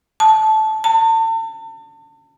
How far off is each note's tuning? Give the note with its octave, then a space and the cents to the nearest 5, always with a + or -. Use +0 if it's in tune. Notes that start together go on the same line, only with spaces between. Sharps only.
A5 -15
A5 +40